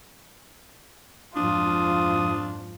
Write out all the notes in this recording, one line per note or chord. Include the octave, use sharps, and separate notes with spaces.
F2 G#2 F3 D4 F4 D#6